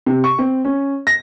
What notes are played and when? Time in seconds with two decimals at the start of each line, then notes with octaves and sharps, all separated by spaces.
0.06 C3
0.24 C#6
0.39 C4
0.65 C#4
1.07 A#6